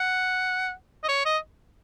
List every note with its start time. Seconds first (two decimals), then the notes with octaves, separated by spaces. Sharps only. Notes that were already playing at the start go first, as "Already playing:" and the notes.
Already playing: F#5
1.04 D#5
1.08 C#5
1.26 D#5